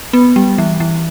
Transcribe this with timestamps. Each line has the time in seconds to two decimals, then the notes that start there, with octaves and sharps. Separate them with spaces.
0.13 B3
0.36 G3
0.58 E3
0.80 E3